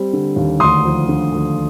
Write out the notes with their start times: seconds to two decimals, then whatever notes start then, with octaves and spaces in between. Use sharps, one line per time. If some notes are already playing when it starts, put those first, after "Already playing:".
Already playing: G3 C4
0.13 D3
0.36 D#2
0.60 D2 C6 D#6
0.84 F3
1.08 D3
1.32 D2